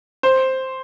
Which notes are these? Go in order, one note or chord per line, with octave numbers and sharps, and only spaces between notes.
C5